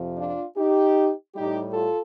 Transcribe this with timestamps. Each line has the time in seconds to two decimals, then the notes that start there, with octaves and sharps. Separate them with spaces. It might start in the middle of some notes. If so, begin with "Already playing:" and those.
Already playing: F2 C3 F3
0.18 D4 F4
0.57 D#4 G4
1.35 A2 G3 D#4 G4
1.73 F4 A4